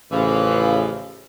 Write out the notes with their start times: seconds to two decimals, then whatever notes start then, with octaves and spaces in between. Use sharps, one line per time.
0.12 A1 C#3 E3 F3